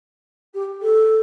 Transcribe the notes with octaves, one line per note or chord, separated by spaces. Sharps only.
G4
A4